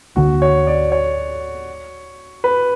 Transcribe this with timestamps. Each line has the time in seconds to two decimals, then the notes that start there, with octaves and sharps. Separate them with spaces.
0.16 D2 D3 A#3 D4 F#4
0.42 C#5
0.67 D5
0.92 C#5
2.44 B4